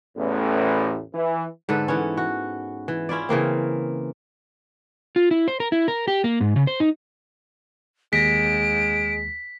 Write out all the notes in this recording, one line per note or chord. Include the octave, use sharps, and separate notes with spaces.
A1 E2 A2
E3
G#2 D3 A4 B4
E3 B3 C#4
F#4
E3
C#4 E4 F4 D5
C#3 E3 A#3 C4
F4
E4
C5
A#4
E4
A#4
G4
A#3
G#2
C#3
C5
D#4
D#2 G#3 A#6 B6 D7